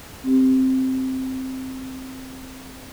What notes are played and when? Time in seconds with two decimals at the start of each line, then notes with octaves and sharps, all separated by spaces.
0.24 C4 G4